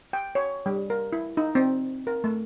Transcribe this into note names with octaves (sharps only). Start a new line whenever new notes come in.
G5
C#5
G3
A#4
E4
D#4
C4
A#4
A3